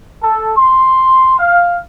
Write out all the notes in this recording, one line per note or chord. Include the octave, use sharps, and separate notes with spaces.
A4
C6
F5